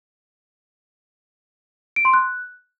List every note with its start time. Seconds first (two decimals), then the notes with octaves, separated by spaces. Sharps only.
1.96 D7
2.05 C6
2.14 F#6